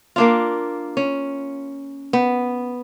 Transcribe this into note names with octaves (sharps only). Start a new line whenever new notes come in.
A#3 D4 F4
C#4
B3